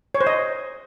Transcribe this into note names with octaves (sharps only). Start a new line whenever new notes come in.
C#5
C5
D#5